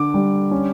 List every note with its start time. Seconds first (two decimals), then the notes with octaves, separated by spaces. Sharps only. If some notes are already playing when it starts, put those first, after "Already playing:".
Already playing: D3 D6
0.14 G3
0.51 C#4